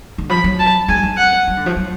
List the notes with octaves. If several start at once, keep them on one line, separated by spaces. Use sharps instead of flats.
D3
F3 B5
F#3
A5
G#3 G#5
F#3
G#3
F#5
F#3
D3
F3
F#3